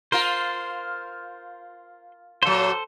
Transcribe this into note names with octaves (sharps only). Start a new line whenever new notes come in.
F4 A#4 C5
A#2 F#3 A4 C5